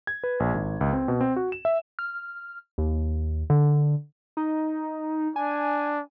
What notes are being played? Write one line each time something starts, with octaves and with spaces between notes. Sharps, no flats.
G#6
B4
A#1
G#1
C#2
C4
B2
C4
F#4
E7
E5
F6
D#2
D3
D#4
D4 G#5